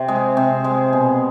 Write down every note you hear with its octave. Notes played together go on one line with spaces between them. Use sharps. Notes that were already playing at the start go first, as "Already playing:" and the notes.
Already playing: C3
G#3
C3
G#3
B2